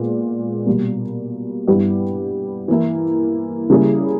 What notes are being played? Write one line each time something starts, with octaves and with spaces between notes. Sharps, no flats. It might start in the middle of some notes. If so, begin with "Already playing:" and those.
Already playing: A#2 G#3 B3
B2 G3 A#3
G2 G3 B3 E4 G4
E3 A#3 E4
C#3 G3 A#3 E4 G#4